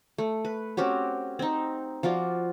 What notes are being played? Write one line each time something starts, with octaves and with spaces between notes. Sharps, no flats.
A3
B4
C4 C#4 F#4 G4
C4 D#4
F3 F4 F#4 D5